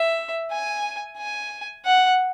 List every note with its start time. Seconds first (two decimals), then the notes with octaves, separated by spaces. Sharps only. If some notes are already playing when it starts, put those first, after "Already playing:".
Already playing: E5
0.51 G#5
1.17 G#5
1.85 F#5